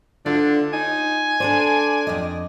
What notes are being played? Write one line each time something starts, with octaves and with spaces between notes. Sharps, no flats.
D3 D4 F4
D#4 G#5
D4 A4 C5 D5
F2 D#5